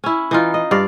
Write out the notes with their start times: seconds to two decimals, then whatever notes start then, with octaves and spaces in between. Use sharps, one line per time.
0.04 C#4 E4
0.31 E3 D#4 F4
0.54 D#5
0.71 G2 D5 F5